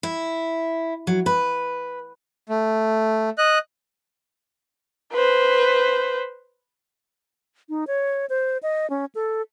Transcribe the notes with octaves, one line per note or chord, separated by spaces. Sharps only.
E4
F#3
B4
A3
D#5 F#6
B4 C5
D#4
C#5
C5
D#5
C#4
A4